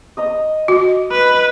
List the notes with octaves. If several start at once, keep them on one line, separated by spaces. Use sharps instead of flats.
D#5 A#5 D#6
F#4 D#5
B4